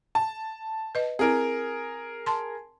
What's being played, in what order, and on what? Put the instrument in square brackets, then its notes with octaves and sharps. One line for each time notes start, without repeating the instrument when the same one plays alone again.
[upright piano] A5
[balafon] B4 D#5
[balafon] C4 E4 [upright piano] G#4 A#4
[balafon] A5 C6